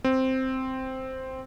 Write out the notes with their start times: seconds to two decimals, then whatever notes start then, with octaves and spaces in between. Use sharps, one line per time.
0.04 C4